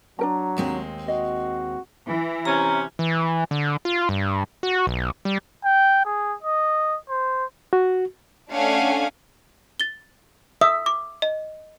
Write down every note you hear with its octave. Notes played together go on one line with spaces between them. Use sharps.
F#3 D4 A#4 A#5
D#2 G#3 C4
F#4 D#5
E3
C3 C#4 A#5
E3
D3
F4
G2
F#4
B1
G3
G5
G#4
D#5
C5
F#4
A3 C#4 D4 F5 F#5 G#5
A6 G7
E5 D#6
D6
D#5